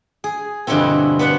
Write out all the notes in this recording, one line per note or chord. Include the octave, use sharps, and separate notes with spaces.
G#4
G2 B2 D3 E3 F3 C4
B3 D4 B4 C5 F#5